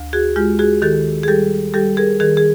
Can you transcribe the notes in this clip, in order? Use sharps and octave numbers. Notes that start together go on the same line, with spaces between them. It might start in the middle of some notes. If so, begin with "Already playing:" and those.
Already playing: D2
F#4 G#4
G#3 F4 G4
F#4 G#4
D#3 G4 A4
G#4
G3 G4 A4
G3 G4 A4
G#4 A#4
D#3 G#4 A#4
G#4